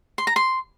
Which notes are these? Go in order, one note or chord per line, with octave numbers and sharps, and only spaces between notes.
C6
A#5
C6